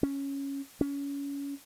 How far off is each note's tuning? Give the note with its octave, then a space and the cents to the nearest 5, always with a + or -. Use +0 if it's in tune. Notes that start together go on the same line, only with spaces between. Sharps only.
C#4 +0
C#4 +25